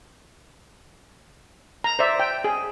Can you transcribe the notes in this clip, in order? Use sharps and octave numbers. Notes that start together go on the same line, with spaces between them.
A#5
C5 D5 E5
G5
G#4